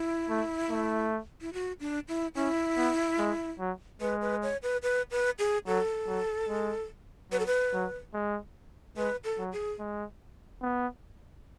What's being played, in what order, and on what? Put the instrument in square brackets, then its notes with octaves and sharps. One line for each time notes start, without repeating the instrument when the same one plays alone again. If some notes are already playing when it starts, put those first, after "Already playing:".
Already playing: [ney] E4
[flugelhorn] A3
A3
[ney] E4
F#4
D4
E4
[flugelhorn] C#4 [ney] E4
[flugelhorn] B3
G#3
F#3
[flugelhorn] G#3 [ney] B4
[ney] B4
C#5
B4
B4
B4
G#4
[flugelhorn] F#3 [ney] A4
[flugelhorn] F#3
G#3
[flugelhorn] F#3 [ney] B4
[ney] A4
B4
[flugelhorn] F#3
G#3
[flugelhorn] G#3 [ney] B4
[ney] A4
[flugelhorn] F#3
[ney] G#4
[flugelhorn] G#3
B3